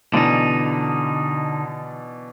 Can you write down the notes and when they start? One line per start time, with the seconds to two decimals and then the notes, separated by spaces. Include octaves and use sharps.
0.14 B2 D3 E3 D4 D#4